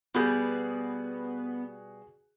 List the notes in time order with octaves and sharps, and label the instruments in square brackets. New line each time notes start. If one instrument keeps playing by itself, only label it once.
[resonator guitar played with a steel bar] B2 G3 [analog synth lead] B3 [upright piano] F#4 G#4